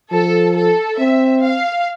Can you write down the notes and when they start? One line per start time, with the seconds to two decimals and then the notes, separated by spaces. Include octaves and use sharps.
0.12 F3 A4
0.56 A4
0.99 C4 E5
1.43 F5